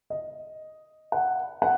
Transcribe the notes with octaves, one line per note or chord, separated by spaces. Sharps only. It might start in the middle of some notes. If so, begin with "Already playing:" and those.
D#5
F#5
F#5